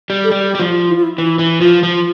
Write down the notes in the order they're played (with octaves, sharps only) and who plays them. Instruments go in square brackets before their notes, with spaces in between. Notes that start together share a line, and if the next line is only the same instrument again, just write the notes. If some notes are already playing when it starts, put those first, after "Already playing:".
[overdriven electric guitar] G3
[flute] A4
[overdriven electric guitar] G3 [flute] G4
[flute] G4
[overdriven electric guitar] G3
[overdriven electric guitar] F3 [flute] F4
[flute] E4
F4
E4
[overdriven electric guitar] E3 [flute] E4
[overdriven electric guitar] E3
[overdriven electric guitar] F3 [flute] F4
[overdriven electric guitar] F3
[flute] F4